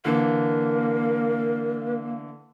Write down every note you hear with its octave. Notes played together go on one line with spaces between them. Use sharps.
D3 E3 A#3 A#4